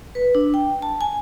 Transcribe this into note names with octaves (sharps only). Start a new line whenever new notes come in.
B4
D4
G5
A5
G#5